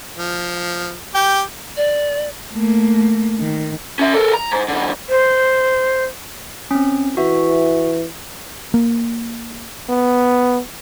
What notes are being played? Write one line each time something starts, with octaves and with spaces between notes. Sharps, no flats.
F3
G4 G5
D5
A3 A#3
D#3
C#4 E5
A4 A#4
A#5
G#2
F#2 D3
C5
C4 C#4
E3 F#4 E5
A#3
B3